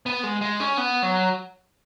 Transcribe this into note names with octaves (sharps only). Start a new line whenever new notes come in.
B3
G#3
G#3
C#4
B3
F#3